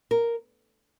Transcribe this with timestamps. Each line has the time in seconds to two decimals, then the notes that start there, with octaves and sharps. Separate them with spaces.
0.11 A#4